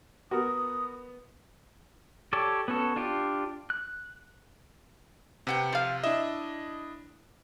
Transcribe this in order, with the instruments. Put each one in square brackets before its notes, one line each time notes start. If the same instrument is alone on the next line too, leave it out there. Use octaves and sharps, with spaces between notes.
[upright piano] B3 [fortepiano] F#4 A#4 [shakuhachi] D#6
[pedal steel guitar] G4 A4 C#5 D5
B3 C#4 F#4 A4
D4 F4 G4
F#6
[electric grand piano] C3 [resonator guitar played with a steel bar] B4 F#5 G5
[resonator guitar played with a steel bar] F3 F5
[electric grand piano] D4 E4 D#5 [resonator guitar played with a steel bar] E5